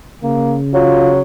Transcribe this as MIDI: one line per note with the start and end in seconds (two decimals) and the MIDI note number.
0.23 1.21 49
0.23 0.57 58
0.74 1.22 54
0.74 1.12 65